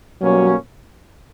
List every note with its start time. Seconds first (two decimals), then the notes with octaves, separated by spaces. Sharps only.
0.21 B2 F#3 G3 A#3 C#4